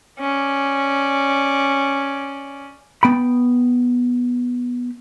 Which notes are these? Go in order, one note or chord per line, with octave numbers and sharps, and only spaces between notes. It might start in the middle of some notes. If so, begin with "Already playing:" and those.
C#4 D5
B3 G5 B5